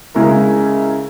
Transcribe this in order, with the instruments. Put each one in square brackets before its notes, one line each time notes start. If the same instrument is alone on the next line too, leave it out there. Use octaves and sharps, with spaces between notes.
[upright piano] C#3 G#3 C#4 E4 A#4